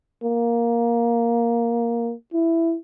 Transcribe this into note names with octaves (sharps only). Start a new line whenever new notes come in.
A#3
E4